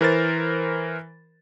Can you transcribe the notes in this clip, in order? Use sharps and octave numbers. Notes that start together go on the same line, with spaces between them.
E3 A#4 C5 A6